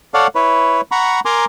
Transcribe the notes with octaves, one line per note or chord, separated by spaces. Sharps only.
A4 C#5 D5 F5 F#5
E4 B4 C#5
F#5 A#5 B5 C#6
A#4 G#5 A#5 C6 D6